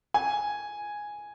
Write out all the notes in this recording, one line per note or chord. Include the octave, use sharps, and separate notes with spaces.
G#5